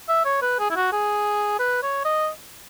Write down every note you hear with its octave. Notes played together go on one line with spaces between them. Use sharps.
E5
C#5
B4
G#4
E4
F#4
G#4
B4
C#5
D#5